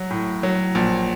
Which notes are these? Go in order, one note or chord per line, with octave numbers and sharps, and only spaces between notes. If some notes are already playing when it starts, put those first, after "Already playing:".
Already playing: F#3
A2
F#3
A#1